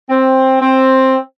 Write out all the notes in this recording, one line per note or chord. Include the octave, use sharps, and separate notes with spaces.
C4
C4